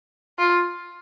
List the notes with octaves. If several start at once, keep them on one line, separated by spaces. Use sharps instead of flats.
F4